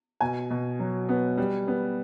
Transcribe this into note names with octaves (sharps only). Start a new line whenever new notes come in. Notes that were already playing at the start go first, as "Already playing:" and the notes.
B2 G#5
B2
F#3
B3
G3
B3